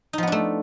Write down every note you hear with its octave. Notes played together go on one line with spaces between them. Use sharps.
F3 A3 B3 D4 D#4